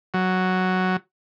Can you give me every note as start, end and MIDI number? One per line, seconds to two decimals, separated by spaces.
0.14 0.96 54